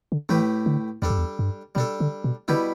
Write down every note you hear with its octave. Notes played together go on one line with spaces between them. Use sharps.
D3
A2 E3 A3 G4 B4
D3
E2 G3 D4 A4
G2
E2
G2
B2 G3 D4 A4
D3
B2
B2 D3 G3 E4 G4 B4